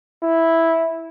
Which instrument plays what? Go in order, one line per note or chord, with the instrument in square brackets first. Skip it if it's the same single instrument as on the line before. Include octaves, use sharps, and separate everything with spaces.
[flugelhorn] E4